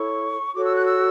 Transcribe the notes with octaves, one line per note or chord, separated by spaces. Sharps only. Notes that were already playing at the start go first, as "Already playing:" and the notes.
Already playing: E4 A4 C#5 C#6
F#4 A4 C#5 D6
E6
F#6
E6